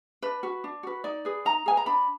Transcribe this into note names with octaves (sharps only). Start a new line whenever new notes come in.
D4 B4
F#4 B4
D4
F#4 B4
D#4 D5
G#4 B4
D#4 A#5
G#4 B4 G#5
A#5
D4 B5